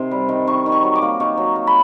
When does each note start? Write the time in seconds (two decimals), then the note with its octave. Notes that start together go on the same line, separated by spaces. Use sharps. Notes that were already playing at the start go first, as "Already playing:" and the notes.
Already playing: C3 D#3 C6
0.11 G3
0.29 D#3
0.47 D#3 C#6
0.66 D#3
0.72 C#6
0.83 F#3
0.96 D6
1.02 A#3
1.20 D#3 C#6
1.38 F#3
1.56 A#3
1.67 B5